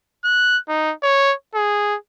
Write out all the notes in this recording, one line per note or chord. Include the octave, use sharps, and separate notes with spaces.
F#6
D#4
C#5
G#4